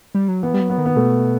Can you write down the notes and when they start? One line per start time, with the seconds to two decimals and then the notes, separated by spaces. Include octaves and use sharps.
0.15 G3
0.28 F#3
0.43 E3 B3
0.54 G3
0.61 F#3
0.70 B3
0.78 D#3
0.86 B3
0.96 B2 A3